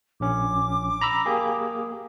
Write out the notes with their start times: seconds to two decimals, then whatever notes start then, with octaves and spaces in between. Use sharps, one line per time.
0.20 A#1 C#4 D6
1.01 A#5 B5 E6
1.26 A#3 G4 G#4